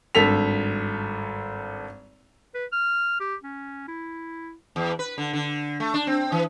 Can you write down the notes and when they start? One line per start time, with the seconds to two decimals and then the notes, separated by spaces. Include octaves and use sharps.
0.15 G#1 G2 A4 B6 F7
2.54 B4
2.72 F6
3.20 G4
3.44 C#4
3.88 E4
4.76 E2
4.99 B4
5.18 D3
5.33 D3
5.80 A3
5.94 D4
6.07 C4
6.32 E3